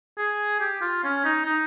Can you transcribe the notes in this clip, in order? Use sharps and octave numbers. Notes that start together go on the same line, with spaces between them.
G#4
G4
F4
C#4
D#4
D#4